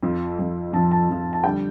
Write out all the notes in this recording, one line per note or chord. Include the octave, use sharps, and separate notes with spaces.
F2 F3
F2 F3
F2 F3 A5
A5
F2 F3
A5
D3 G3 G5